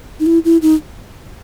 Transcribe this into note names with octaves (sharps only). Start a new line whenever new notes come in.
D#4
E4
E4
D#4